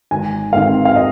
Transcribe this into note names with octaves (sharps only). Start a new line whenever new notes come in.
G#1 G#5
G#2 D#3 C4 F5
F5
D#5